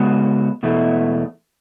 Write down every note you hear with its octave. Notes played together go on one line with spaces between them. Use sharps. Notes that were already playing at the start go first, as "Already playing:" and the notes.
Already playing: C#3 G#3 B3 F#4
E2 B2 A3 E4